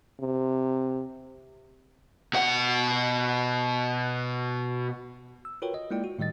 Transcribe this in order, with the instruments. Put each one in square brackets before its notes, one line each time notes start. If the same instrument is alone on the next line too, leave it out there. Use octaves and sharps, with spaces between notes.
[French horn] C3
[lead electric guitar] B2 F#5
[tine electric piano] E6
F4 F#4 A#4 B4 C#5 G5
D#5
G#3 A#3 E4 F4 D5 G5
F#4
A2 D#3 G3 D#5 A6